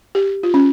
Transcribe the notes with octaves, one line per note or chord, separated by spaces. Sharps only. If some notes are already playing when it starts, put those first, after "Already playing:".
G4
F4
C#4